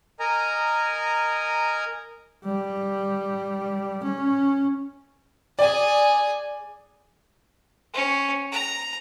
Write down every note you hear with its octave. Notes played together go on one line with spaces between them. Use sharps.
A#4 D#5 G#5 A#5
G3
C#4
G#4 D5 G#5
C#4
A#5